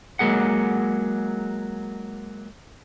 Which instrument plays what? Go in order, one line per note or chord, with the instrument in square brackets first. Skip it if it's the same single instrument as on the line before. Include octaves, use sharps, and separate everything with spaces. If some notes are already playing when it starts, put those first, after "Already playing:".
[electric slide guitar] F#3 G#3 A#3 G#4 F#5